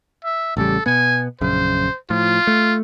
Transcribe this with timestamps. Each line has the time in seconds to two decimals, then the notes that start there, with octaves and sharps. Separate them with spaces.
0.24 E5
0.57 A1 C#3 G3 A4
0.86 B2 B3 G#5
1.41 A#1 F#2 C#3 C5
2.10 A2 F3 F4
2.47 A3